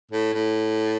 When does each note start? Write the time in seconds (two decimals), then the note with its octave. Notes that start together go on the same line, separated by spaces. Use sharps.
0.11 A2
0.34 A2